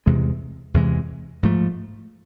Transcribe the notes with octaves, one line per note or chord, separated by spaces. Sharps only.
E2 C3 E3 G#3
E2 C3 E3 G#3
G#2 F3 A3